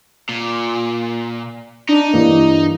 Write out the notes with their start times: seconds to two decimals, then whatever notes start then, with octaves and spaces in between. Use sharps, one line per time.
0.29 A#2
1.89 D4 D#4
2.13 G2 E3 A#3